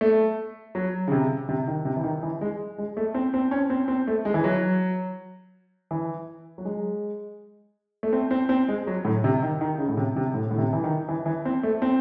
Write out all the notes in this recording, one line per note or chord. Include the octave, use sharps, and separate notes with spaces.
A3
F#3
C#3
C3
C3
D#3
C3
E3
D#3
E3
G#3
G#3
A3
C4
C4
C#4
C4
C4
A3
G#3
E3
F#3
E3
F#3
G#3
A3
C4
C4
C4
G#3
F#3
A2
C3
D#3
D#3
C#3
A2
C3
C3
A2
A2
C3
E3
D#3
E3
E3
C4
A3
C4